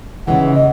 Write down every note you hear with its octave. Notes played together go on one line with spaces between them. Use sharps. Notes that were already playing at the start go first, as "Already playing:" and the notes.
D#2 C#3 E3 G#3 F#5
D#5